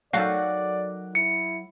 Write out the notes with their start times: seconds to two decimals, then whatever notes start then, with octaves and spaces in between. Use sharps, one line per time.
0.13 D#3 F#3 F#4 A4 D5 F5
1.15 E4 C#7